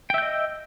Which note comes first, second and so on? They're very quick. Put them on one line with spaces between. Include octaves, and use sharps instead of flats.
G5 E5 G6 D#5